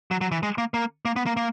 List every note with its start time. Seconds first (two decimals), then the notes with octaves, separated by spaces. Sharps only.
0.11 F#3
0.21 F#3
0.32 E3
0.43 G#3
0.58 A#3
0.74 A#3
1.05 A#3
1.16 B3
1.26 A#3
1.37 A#3